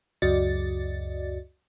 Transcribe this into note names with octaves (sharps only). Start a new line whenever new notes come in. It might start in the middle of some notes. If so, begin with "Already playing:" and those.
C#2 F#2 F#4 D5 D#5 A6